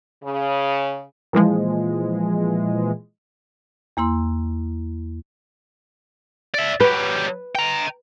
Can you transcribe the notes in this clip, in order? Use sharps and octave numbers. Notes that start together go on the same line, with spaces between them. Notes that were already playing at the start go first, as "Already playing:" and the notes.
C#3
A#2 E3 F3 G#3
E2 A#3 E4 C6
D5 E5
F#3 G3 B4
G5 A#5